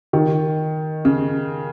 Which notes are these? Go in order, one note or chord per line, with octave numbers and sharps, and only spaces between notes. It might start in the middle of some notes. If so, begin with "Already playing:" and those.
D#3
C#3